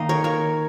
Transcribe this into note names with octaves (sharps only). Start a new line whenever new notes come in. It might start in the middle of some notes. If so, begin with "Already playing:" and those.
Already playing: D#3 A#3 D#4 D#5 F5
A#4 C#5
A#4 C#5